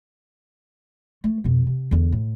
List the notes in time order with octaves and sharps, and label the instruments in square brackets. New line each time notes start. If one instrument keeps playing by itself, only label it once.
[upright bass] A3
F2 B2
C3
E2 D3
A2